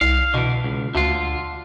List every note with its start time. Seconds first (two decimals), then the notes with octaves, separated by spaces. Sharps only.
0.01 C2 F5
0.34 B2 D3 E3
0.64 C#2
0.95 D2 D3 F4